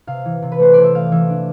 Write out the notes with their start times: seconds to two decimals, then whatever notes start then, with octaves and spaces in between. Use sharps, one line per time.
0.07 C3 F5
0.25 E3
0.42 C3
0.52 B4
0.60 A3 C5
0.74 E3 D5
0.84 E5
0.95 A3 F5
1.12 E3 E5
1.29 D4